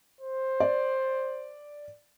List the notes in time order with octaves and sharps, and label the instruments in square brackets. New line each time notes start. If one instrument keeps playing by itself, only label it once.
[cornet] C5
[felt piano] D5